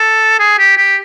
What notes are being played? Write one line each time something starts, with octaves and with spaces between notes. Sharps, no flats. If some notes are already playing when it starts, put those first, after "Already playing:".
Already playing: A4
G#4
G4
G4